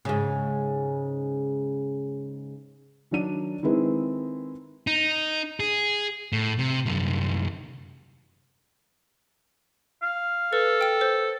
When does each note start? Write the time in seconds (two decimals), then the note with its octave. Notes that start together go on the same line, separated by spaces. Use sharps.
0.05 G#2 C#3
3.11 D#3 F#3 D4 D#7
3.63 D#3 G#3 C4 E4 B4
4.87 D#4
5.60 G#4
6.33 A2
6.59 C3
6.86 C2 F#2
10.03 F5
10.53 A4 B4
10.81 G5 E6
11.01 C5